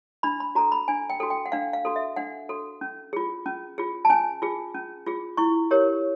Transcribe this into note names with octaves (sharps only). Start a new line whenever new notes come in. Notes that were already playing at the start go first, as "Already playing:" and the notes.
D4 B5
B5
F#4 A4 A#5
B5
D4 G#5
G5
F#4 A4
G5
F#5
D4 F5
F5
F#4 A4
E5
D4 F#5
F#4 A4
C#4
F4 G#4
C#4
F4 G#4
A5
C#4 G#5
F4 G#4
C#4
F4 G#4
E4 C#6
G4 A#4 C#5